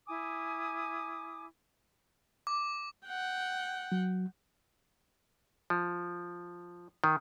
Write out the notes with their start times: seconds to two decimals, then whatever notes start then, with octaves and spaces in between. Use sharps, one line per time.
0.07 E4 G#5 D6 D#6
2.47 D6
3.06 F#5 G5
3.92 F#3
5.70 F3
7.04 D#3